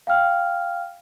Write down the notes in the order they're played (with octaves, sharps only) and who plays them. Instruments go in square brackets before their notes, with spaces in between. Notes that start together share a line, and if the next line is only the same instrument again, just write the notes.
[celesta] F5 G5 F6